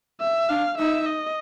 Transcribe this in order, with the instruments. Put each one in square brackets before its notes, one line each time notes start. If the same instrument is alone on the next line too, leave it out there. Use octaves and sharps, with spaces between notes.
[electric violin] E5
[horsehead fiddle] D4 [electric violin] F5
[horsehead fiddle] D#4 [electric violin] E5
[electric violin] D#5